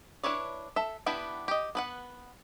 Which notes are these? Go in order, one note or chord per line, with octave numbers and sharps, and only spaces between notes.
D4 E4 B4 C#5 D5
A4 E5
B3 D4 E4 G4 B4
G4 D#5
B3 B4 F#5